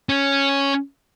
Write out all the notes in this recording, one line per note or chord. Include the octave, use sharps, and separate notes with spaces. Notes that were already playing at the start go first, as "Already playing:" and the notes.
C#4